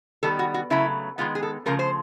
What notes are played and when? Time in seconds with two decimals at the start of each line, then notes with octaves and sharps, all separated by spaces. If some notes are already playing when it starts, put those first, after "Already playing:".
0.23 D#3 G3 B3 A4
0.39 F#4
0.54 F#4
0.70 C#3 F#3 A3 E4
1.18 D#3 G#3 B3 F4
1.35 G#4
1.43 A4
1.66 C#3 F3 A3 A#4
1.79 C5